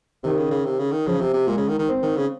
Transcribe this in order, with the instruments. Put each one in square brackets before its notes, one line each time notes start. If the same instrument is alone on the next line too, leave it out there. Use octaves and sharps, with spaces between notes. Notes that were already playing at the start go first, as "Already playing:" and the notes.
[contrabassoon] C3 [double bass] D#3
[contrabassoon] C#3
C#3
C3
C#3
D#3
[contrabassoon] C#3 [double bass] F3
[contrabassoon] C3
C3
[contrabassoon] A#2 [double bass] G#3
[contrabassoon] C#3
D#3
D#3
[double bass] C4
[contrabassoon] D#3
C#3